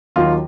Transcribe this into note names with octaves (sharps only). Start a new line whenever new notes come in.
D#2 D#3 F#3 F4